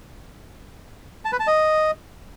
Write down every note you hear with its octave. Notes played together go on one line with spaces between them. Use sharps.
A5
B4
A5
D#5